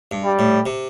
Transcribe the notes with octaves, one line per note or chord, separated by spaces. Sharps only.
G2
G3
A2
C3